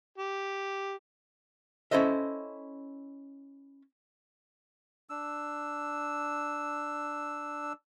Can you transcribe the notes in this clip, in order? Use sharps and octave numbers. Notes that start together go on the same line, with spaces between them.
G4
C#4 E4 A4 C5 D#5 E5
D4 E6